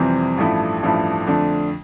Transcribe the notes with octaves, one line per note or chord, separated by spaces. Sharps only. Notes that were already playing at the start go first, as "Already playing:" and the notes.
Already playing: F2 C3 E3 G3 C4
A1 G2 F3 A3 E4
A1 G2 F3 A3 E4
F2 D3 A3 D4